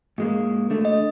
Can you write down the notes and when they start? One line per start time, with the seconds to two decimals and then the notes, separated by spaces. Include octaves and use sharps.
0.18 G#2 G#3 A#3
0.70 D3 A3
0.85 D#5